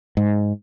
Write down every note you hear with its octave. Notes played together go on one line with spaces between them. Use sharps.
G#2